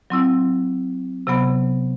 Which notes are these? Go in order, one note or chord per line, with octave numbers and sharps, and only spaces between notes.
F#3 C4 E4
C3 F#3 B3